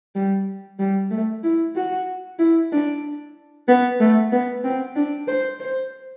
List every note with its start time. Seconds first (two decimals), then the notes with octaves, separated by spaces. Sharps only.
0.15 G3
0.79 G3
1.11 A3
1.43 E4
1.76 F#4
2.39 E4
2.72 D4
3.68 B3
4.00 A3
4.32 B3
4.64 C4
4.96 D4
5.28 C5
5.60 C5